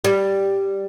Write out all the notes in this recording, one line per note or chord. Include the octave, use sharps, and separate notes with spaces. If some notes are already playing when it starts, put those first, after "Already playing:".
G3